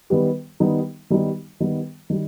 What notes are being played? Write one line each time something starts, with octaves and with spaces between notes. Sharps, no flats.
D#3 G3 B3 G4 B4
D#3 G3 B3 D#4
D#3 G3 B3 D#4
D#3 G3 B3
D#3 G3